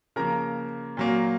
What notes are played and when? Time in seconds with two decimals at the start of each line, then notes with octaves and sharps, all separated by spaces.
0.16 C#3 F3 A#3 A#4 A#5
0.97 A#2 F#3 A#3